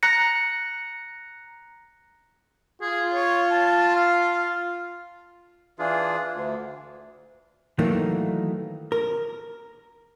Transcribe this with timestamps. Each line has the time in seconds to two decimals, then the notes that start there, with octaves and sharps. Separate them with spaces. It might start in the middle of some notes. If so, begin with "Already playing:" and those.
0.03 A#5 F#6 A#6 C#7
2.82 F4 G#4
3.14 C#5
3.51 A5
3.96 F5
5.79 E3 D4 F4 G#4
6.35 D2
7.78 D#3 E3 F#3 A3 A#3 D#4
8.92 A#4